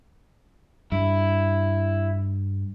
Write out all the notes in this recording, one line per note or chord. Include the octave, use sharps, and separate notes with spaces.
G2 E4